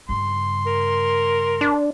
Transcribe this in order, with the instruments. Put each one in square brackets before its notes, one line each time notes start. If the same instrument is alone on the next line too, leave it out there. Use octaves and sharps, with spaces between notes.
[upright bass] G2 C#3 [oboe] C6
[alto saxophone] A#4
[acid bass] D4